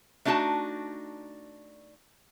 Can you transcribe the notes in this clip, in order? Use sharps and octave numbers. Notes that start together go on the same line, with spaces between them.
A3 D4 D#4 F#4 A5